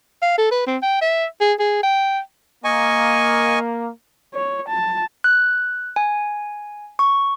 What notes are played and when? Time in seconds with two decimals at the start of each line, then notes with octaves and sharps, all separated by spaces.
0.22 F5
0.38 A4
0.51 B4
0.67 C4
0.82 G5
1.02 E5
1.41 G#4
1.59 G#4
1.83 G5
2.64 A#3 D#5 G#5 C#6
4.34 C#5
4.69 A5
5.24 F#6
5.96 G#5
6.99 C#6